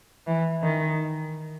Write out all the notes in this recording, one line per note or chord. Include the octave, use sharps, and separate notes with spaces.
E3
D#3